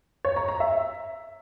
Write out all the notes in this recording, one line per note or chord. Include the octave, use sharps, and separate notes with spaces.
C#5
A#5
A#5
E5